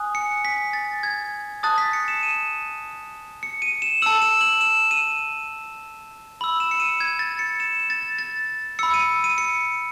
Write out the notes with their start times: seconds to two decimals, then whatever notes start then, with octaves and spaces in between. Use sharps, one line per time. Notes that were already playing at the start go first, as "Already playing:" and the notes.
Already playing: G#5 D#6 F#6
0.15 C#7
0.45 B6
0.73 A6
1.03 G#6
1.63 A5 D#6 F#6 A6
1.78 B6
1.93 C#7
2.08 E7
2.23 D#7
3.43 C#7
3.62 D#7
3.82 E7
4.02 A5 E6 F#7
4.22 E7
4.41 F#7
4.61 E7
4.91 D#7
6.41 B5 E6 F#7
6.60 E7
6.71 C#7
6.80 D#7
7.00 G#6
7.19 A6
7.39 C#7
7.60 E7
7.90 A6
8.19 A6
8.79 B5 E6 C#7
8.94 D#7
9.24 D#7
9.38 C#7